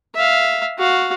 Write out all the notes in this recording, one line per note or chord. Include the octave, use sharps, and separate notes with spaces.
E5 F5
F#4 F5